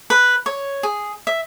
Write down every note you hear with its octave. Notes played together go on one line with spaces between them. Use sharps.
B4
C#5
G#4
E5